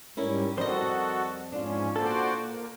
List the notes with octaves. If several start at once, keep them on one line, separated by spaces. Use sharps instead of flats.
G#2 G3 C#4 E4 A#4
F2 G3 F#4 A4 A#4 C5 D#5
G#2 C#4 D4 F4
A#2 F#4 A4 C5 D5
A#3